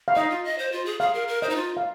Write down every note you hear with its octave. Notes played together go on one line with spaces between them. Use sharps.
F5
D#4 D#5
F4
D#5
C5
F4
G#4
G#4 F5
A#4
A#4
C5 D#5
D#4
F4
F5